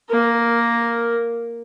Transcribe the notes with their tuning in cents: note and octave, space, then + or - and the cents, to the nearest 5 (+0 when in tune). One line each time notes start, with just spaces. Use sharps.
A#3 +0 A#4 +0